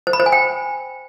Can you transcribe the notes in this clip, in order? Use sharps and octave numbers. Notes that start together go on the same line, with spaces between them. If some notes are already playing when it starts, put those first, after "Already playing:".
C5
B5
C5
G#5
G5